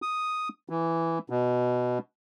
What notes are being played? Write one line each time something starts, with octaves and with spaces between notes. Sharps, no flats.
D#6
E3
B2